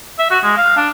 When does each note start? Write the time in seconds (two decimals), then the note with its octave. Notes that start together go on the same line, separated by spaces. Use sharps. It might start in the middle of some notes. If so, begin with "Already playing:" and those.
0.19 E5
0.31 F#4
0.44 G#3
0.57 F5
0.77 D4